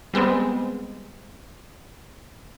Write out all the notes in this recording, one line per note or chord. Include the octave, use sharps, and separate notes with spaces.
G3 G#3 B3 C4